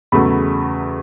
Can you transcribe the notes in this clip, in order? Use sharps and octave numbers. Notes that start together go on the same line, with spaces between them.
E2 C#3 F#3 A3 B5